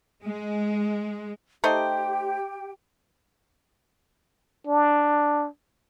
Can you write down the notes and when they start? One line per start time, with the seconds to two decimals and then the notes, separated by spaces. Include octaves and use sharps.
0.23 G#3
1.64 A3 D#4 G4 C5 G5
4.67 D4